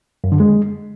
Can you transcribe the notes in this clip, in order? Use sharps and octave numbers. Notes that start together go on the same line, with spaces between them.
F#2
D3
G#3